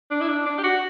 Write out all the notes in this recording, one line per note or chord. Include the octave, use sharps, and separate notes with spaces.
D4
E4
D4
D4
G4
F#4